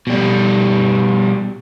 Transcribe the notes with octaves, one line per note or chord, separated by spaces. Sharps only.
B2 G3